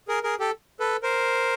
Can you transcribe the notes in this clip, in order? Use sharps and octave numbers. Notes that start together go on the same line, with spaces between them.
G#4 A#4
G#4 A#4
G4 A4
A4 B4
A#4 C5